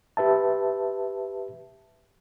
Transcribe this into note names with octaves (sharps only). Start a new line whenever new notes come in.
G4 B4 E5 A5